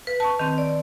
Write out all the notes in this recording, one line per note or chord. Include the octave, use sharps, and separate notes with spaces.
B4
A5 C#6
D#3 C4
D5